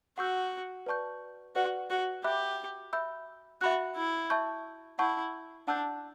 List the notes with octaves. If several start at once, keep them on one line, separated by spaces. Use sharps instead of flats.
F#4 F#5 C#6 E6 G6
B4 D5 A5 C#6 G6
F#4 B4 D5 F#5
F#4
G4 E5 B5 D6 F#6
E5 B5 E6 G6
F#4 E5 B5 F#6
E4
E5 A5 C#6 G6
E4 F#5 A5 C#6 G6
D4 F#5 A5 E6 G6